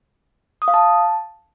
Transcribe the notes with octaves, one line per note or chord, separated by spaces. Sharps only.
D#6
F5
A5